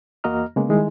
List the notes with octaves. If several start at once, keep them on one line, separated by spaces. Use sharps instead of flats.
E2 A#3 F#4 D#5 A#5 F6
C#3 G#3 A#3 B3
D#3 G3 G#3 E4